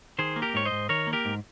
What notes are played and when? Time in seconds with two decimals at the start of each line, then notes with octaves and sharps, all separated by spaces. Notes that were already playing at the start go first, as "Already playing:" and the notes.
0.19 D#3 G#4 C5
0.36 A#3
0.42 G4 A#4
0.54 G#2 C#5
0.65 C5 D#5
0.72 G#2
0.89 D#3 A#4 C#5
1.07 A#3
1.13 G4 A#4
1.25 G#2